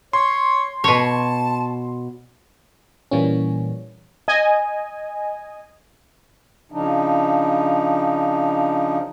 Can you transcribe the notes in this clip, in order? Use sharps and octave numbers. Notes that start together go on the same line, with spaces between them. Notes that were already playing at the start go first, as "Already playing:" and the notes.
C#5 C6
B2 C#5 A5
A#2 E3 G3 A#3 C#4
D#5 G#5
C#3 F3 D4 D#4